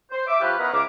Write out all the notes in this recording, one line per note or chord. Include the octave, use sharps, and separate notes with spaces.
C5
E5 D6
F3 C#4 F4 G4 B4
B3 C#4 D#4 E4 A#4 B4
C#2 E5 F5 A#5 D6